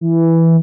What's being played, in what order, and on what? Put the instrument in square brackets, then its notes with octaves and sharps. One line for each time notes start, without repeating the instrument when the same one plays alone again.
[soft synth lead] E3